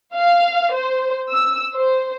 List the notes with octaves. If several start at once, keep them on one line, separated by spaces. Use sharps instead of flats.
F5
C5
E6
C5